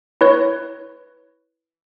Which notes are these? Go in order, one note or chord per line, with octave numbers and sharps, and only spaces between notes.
E4 B4 C#5